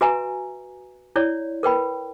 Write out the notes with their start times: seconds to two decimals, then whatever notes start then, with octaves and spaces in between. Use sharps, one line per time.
0.01 F#4 B4 E5 G#5 A#5
1.16 E4 C#5 D5
1.63 A#4 B4 G5 B5